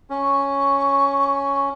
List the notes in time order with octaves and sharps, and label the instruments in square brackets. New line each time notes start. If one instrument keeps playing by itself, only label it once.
[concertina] C#4 [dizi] C#6